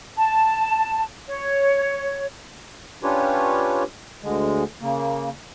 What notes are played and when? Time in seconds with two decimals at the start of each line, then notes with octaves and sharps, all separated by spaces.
0.16 A5
1.26 C#5
3.03 C#4 D4 F4 G4 B4 C#5
4.23 D2 D3 G#3
4.82 C#3 A#3